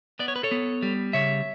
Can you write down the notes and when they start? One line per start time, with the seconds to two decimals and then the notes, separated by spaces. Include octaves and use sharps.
0.19 B3 D5
0.28 C#5
0.36 B4
0.43 A4 C#5
0.51 B3
0.82 G3
1.13 C#3 C#5 E5